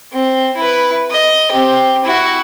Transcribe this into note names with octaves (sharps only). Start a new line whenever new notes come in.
C4
E4 B4
D#5
C4 G4
E4 F#4